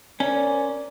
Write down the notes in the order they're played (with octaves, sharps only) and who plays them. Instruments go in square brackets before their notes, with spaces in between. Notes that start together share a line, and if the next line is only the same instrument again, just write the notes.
[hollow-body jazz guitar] C#4 [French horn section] A#4 C5 D5